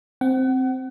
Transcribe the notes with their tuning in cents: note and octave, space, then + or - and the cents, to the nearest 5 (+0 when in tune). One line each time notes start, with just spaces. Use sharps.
C4 +0 F#5 +35